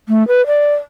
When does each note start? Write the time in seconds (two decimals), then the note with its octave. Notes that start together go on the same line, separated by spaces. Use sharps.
0.09 A3
0.28 B4
0.47 D5